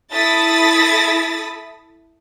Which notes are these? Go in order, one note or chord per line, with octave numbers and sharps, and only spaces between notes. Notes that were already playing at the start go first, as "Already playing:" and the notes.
E4 A4 D#6 A6 B6